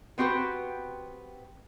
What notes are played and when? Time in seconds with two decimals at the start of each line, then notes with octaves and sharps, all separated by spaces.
0.18 B3 C4 F#4 G4 B4